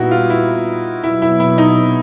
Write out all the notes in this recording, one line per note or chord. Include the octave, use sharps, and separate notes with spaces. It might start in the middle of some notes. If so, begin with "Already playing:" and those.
Already playing: A#2 G3 B3 D#4 E4 F#4
F4
E4
B2 F#3 B3 E4
E4
E4
D#4